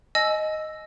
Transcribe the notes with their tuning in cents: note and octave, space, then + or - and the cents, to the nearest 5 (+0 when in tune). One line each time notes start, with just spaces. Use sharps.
D#5 +0 G#5 +35 E6 +0